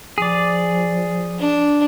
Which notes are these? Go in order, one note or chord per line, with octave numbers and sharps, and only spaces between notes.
F3 G#4 D5
D4